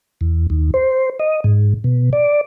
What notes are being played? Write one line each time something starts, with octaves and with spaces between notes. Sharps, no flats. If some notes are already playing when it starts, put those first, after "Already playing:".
E2
D#2
C5
D#5
G#2
B2
D5